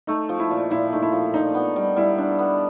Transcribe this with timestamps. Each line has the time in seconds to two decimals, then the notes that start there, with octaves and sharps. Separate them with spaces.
0.07 A3 D#4
0.29 F3
0.40 E4
0.50 A#2
0.70 A#2 E4
0.92 A3 D#4
1.02 E4
1.13 F3
1.34 D4 D#4
1.54 B3
1.76 G3
1.96 G3 E4
2.18 D4
2.39 B3